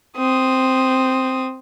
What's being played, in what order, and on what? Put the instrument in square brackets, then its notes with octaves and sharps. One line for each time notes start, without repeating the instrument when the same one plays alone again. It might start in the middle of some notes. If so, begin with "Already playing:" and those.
[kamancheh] C4 D#6